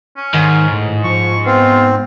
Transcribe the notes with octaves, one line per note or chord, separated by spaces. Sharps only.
C#4
G#2 D#3
A2
F3 C#6
B3 C4 F4